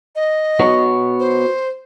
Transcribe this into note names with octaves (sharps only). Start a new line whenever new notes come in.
D#5
B3 F#4 C#5
C5